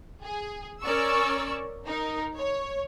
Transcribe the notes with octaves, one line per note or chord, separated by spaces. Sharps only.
G#4
C#4 A#4 D5 C#6 E6
D#4 A#4
C#5